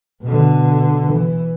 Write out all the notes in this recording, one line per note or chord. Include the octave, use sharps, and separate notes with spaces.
B2 D3
E3